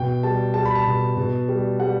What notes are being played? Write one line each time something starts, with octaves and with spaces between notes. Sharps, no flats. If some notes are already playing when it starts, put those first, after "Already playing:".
Already playing: B2 G5
G3 A5
G3 A5
B5
A5
B2
B2
G3
G3 F#5